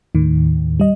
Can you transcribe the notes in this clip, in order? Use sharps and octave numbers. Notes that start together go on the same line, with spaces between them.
D#2 A2 D#3
G3 D#5